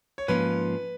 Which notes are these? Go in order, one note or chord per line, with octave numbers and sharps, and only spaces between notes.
C#5
G#2 F3 A#3 C#4 F4 B4